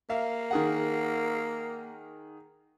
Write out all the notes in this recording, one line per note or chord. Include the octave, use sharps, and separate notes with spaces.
A#3 E5 F5
D#3 G#4 F#5